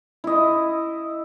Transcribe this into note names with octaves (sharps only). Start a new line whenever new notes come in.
E4 D#5